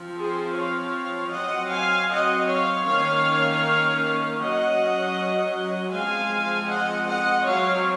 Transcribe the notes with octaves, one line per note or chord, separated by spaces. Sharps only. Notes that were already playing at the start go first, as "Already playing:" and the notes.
Already playing: F3 C4
G#4 C5
C#5 F5
F#3 C4 D#5 F#5
F5 G#5
D#5 F#5
C#5 F5
D#3 A#3 C#4 C#5 F5
F#3 C#4 D#5 F#5
F3 G#3 C4 F5 G#5
D#5 F#5
D#5 F#5
F#3 C4 C#5 F5